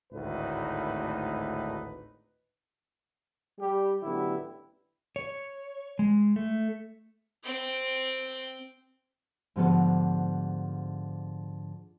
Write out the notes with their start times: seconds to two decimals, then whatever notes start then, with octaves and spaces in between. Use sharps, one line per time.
0.13 G#1 D2 A2 D#4 B4
3.59 G3 G4
4.03 A1 D3 F#3 B3 E4 G4
5.16 C#5
5.99 G#3
6.36 A3
7.44 C4 G5
9.56 G#2 D3 F3 G3 B3 A4